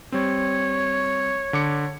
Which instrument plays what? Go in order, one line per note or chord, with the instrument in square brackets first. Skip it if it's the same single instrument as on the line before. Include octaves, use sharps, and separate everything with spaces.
[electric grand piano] G3 C4 [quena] C#5
[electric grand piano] D3 D6 C#7